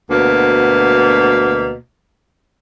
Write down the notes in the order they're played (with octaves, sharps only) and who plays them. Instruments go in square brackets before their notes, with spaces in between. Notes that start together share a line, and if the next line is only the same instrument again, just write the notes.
[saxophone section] D2 B2 A#3